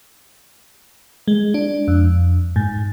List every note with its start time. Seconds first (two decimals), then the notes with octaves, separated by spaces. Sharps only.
1.28 G#3
1.54 D4
1.88 F2
2.56 G#2